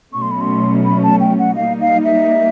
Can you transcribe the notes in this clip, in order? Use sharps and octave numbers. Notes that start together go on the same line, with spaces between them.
B2 F#3 A3 C#4 C#6
C6
B5
C6
B5
A5
G5
F#5
G3 A#3 D#4 F5
F5
E5